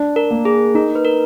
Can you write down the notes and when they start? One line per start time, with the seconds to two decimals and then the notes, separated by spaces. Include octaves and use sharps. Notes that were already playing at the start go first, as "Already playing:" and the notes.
Already playing: D4
0.16 A#4
0.31 A#3
0.45 G#4
0.75 D#4 A#4
0.95 B4
1.05 A#4